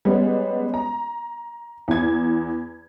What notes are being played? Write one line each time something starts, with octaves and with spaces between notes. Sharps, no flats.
G3 G#3 B3 C#4
A#5
E2 G#6